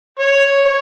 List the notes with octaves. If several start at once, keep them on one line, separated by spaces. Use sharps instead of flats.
C#5
C#5